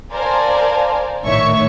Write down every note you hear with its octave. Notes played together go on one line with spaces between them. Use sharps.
A#4 C5 D5 F5 G#5 A5
A#1 A2 D#3 C#5 E5 C#6